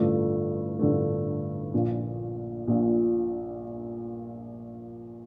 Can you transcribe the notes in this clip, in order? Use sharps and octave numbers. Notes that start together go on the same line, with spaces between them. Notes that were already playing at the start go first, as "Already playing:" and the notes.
Already playing: A1 G2 D3 F3 A3
A1 G2 D3 F3 A3
A#1 A#2 F3
A#1 A#2 F3